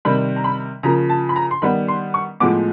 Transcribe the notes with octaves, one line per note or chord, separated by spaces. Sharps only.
C3 D#3 G3 B5
A#5
B5
C#3 F3 A#3 A#5
A5
B5
A#5
C6
D#3 G3 B3 B5
C6
C#6
A2 F3 G#3 B3 D6